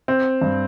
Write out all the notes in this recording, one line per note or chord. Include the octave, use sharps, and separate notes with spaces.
C4
G2